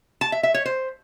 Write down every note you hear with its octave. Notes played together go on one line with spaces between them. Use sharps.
A5
E5
E5
C#5
C5